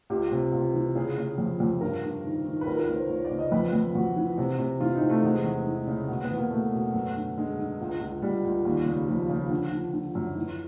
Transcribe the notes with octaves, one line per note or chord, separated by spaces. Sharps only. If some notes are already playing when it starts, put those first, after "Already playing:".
C#2 G4
C3
C#2
E3
C#3 G#4
C#3
F2
F2
G2 A#4
G2
D#3
D#3
B4
C#2 A#4
A#4
B4
C#2
C5
C#2 C#5
D5
C#3
D#5
F2 B4
F2
F2 F#4
E3
C3
C3
E3 F4
D#4
C3
A3
E2 G#3
E2
E3
C#3
B2
B3
E2
A#3
B2 A3
B2
F#2
D3
D3 G#3
D3
C#2
C#2
C#2 G3
C#2
D#2
C#3
D#2 F3
C#3
D3
D3
D3
F#2
E3